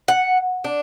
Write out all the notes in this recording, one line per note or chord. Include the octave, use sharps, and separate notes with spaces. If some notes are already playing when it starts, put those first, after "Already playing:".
F#5
D4